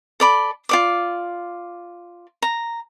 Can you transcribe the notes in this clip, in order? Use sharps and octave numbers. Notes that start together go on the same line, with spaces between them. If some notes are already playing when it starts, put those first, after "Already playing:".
A4 D5 B5
F4 D5 D6
A#5